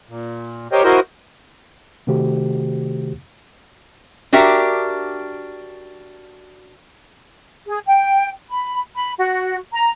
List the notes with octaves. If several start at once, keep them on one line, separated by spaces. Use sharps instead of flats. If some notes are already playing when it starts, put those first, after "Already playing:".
A#2
G4 A#4 C5 C#5 D#5 G5
E4 F#4 A#4 C5 D#5
C3 D#3 A3 F#4 G4 C5
D4 F#4 G4 A#4 E5
G#4
G5
B5
B5
F#4
A#5